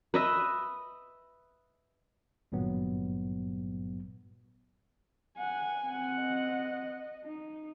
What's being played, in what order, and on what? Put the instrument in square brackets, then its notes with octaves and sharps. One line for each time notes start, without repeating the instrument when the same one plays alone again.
[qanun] B4 D#5 E5
[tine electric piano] G#1 G2 A#2 F#3 B3
[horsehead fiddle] F#5 [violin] G#5
[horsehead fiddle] C4 F#5
[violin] D#5
[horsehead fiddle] D#4